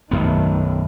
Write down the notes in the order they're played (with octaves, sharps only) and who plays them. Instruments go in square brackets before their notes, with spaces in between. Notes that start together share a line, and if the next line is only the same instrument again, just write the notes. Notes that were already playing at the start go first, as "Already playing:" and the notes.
[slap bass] B1 F#2 B3 [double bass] D#3 A3